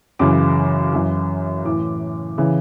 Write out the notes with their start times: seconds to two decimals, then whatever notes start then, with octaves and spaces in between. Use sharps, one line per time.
0.19 F#2 C#3 E3 D6
0.93 F#2 E3
1.65 A2 E3 D6
2.38 C#3 E3